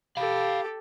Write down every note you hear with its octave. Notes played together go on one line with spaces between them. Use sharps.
G4 A4 F5 B5